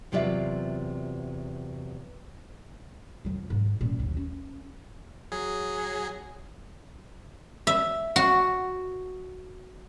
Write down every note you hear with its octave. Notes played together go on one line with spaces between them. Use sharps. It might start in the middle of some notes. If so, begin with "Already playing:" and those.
E2 C3 F#3 F4 D5 E5
F2 F#3
G#2
F#2 A#2
A#1 D#2
C#4
F#3 G#4
E5
F#4